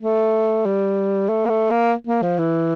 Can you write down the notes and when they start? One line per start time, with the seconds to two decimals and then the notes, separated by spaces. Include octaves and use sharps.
0.02 A3
0.66 G3
1.29 A3
1.46 A#3
1.49 A3
1.71 A#3
2.07 A#3
2.22 F3
2.39 E3